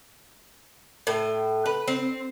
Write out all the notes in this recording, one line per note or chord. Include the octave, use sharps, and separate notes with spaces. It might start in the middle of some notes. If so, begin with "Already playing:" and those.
A2
B4
C4